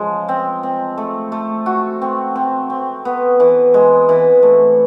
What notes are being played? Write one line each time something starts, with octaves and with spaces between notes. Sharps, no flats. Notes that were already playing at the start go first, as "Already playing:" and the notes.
Already playing: C#3 F3 G#3
C4
C4
A3
A3
F#4
C4
C4
C4
B3
E3
G#3
E3
A3